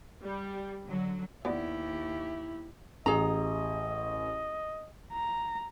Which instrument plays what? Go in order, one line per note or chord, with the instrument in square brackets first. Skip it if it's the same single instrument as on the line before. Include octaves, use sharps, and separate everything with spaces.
[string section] G3
D3 F#3
[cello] D#2 G4 [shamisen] B3 D5 [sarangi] E4
[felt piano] A1 [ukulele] G#4 A#5 [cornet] D#5
[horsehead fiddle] A#5